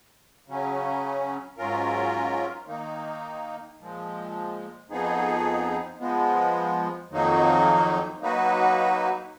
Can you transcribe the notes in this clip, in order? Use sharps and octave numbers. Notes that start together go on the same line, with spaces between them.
C#3 F#3 C#4
G#2 F#3 C#4 F4 A#4
D#3 A#3 D#4
A#2 F3 G#3
F2 F3 B3 D#4 G#4
F3 G#3 B3
F2 D#3 F#3 A#3 D#4
F#3 A#3 D#4 F#4 B4